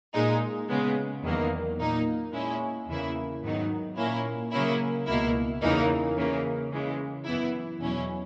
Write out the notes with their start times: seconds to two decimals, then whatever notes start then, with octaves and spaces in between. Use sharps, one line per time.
0.14 A#2 G#3 D#4
0.69 C#3 G#3 B3
1.23 E2 D#3 F#3 A#3
1.79 A#2 A#3 D#4
2.32 A#2 G#3 C#4 E4
2.87 E2 C#3 E3 A#3 E4
3.43 G#2 D#3 F#3 B3 D#4
3.97 A#2 A#3 C#4 E4
4.52 C#3 F#3 A#3 C#4 E4
5.07 C#2 B2 A#3 E4
5.62 E2 C#3 E3 A#3 D#4
6.17 C#3 E3 A#3
6.71 C#3 E3 G#3
7.25 F#2 E3 B3 E4
7.80 E2 B2 F#3 C#4 E4